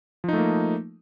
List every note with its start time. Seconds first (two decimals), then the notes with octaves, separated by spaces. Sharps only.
0.24 F3
0.29 D#4
0.33 A3
0.38 A#3